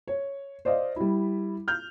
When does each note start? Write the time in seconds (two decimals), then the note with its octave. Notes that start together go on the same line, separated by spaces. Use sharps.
0.07 C#5
0.65 C5 D5 D#5 F5
0.96 G3 E4
1.68 F6 G6